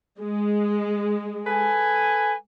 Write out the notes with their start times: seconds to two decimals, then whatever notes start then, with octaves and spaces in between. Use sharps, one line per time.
0.19 G#3
1.47 A4 B4 G#5